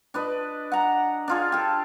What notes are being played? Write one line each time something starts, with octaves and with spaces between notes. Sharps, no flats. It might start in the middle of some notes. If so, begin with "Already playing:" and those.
D4 B4 D#5
F#5 A#5
D4 F4 G#4
G4 A4